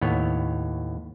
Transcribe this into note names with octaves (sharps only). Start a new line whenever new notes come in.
D#2 A2 B3 C#5